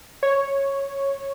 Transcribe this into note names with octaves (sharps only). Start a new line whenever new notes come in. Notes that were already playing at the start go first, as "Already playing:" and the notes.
C#5